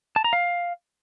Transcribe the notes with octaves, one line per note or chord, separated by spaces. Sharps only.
A5
A#5
F5